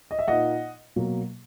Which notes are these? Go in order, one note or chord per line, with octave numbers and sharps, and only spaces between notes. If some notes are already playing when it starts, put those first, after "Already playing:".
D#5
E5
A#2 A#3 D#4 D#5 F#5
B2 F#3 A#3